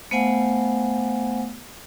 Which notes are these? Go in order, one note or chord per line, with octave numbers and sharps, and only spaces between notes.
A3 B3 C5 F5 F#5 G#5